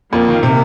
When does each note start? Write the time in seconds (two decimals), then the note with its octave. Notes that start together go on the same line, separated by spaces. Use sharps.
0.12 F2 A#3
0.28 D#3
0.43 C3